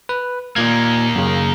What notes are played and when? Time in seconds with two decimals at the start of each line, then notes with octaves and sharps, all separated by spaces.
0.09 B4
0.56 A#2 A#3 D#4 G#6
1.15 F#2 C#3